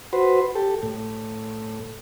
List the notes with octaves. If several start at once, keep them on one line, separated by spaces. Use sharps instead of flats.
F#4 B4 C5
G4 A4
A2